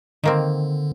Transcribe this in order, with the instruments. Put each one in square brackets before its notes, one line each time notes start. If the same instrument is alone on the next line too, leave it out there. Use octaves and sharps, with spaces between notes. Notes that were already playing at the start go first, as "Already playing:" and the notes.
[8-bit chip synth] D3 [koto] D#3 A#3 C4